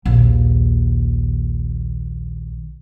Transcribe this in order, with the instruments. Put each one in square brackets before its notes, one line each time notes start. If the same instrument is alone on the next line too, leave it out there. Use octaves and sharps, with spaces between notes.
[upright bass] A#1 D#2